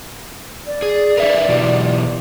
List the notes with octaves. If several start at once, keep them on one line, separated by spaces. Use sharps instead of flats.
D5
G#4
A#4 B4 E5
B2 E3 G4